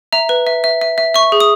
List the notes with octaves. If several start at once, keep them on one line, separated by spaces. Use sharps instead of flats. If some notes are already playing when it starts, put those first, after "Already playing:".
E5 A#5
B4
E5
E5
E5
E5
E5 C#6
G#4
D#6